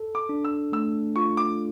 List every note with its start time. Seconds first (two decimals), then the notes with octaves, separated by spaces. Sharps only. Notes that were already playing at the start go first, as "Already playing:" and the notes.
Already playing: A4
0.15 D6
0.29 D4
0.45 E6
0.72 A3 E6
1.16 F4 C#6
1.37 D6